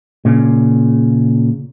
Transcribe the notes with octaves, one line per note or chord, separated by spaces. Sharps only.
A#2 C#3